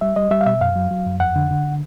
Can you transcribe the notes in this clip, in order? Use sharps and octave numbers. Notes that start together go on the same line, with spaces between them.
G3 E5
G3 D#5
G3 E5
F5
B2 E5
F#2 F5
F#3
F#3
F#2
F2 F#5
D3
D3